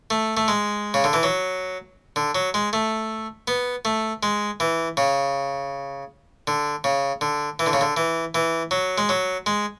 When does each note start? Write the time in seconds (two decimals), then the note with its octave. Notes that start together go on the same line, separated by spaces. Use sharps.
0.10 A3
0.37 A3
0.48 G#3
0.94 C#3
1.04 D3
1.13 E3
1.23 F#3
2.16 D3
2.35 F#3
2.54 G#3
2.73 A3
3.48 B3
3.85 A3
4.23 G#3
4.60 E3
4.97 C#3
6.47 D3
6.84 C#3
7.21 D3
7.59 E3
7.66 D3
7.73 C#3
7.81 D3
7.97 E3
8.35 E3
8.71 F#3
8.98 G#3
9.09 F#3
9.46 G#3